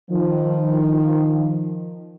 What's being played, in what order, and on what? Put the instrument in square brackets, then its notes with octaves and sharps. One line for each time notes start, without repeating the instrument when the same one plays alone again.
[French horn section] D#3 F3